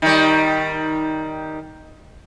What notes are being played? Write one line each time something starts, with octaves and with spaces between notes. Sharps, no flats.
D#3 G3